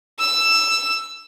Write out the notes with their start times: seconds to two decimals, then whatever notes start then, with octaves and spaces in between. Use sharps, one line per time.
0.19 E6